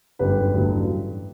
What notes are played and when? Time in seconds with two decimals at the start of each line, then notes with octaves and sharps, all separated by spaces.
0.19 G1 F#2 D3 G3 G4 B4
0.54 A1 G2 D3 F#3